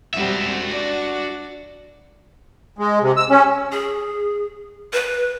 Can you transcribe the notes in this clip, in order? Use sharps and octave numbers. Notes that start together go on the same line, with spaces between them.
G3 C4 F#4 E5
D4 D5
G#3
C3
E6
C#4
G#4
B4